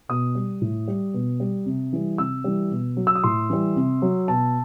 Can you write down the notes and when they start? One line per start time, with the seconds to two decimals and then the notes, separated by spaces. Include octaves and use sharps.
0.09 B2 D#6
0.35 G3
0.61 A2
0.88 G3
1.14 B2
1.40 G3
1.66 C3
1.93 E3 G3
2.18 C3 E6
2.44 E3 G3
2.71 B2
2.97 F#3
3.07 E6
3.15 D#6
3.24 A2 C6
3.50 E3 G3
3.76 C3
4.02 F#3
4.28 B2 A5